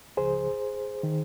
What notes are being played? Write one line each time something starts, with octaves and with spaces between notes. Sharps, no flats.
C#2 C#3 F3 G#4 C5
D#3